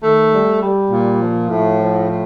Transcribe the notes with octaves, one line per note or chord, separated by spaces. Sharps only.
D#3 A3
G3
G3
A#2
F3
A2
F3
A2